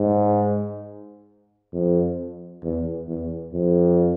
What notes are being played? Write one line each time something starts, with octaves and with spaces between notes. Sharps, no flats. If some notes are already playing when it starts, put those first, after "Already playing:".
Already playing: G#2
F2
E2
E2
F2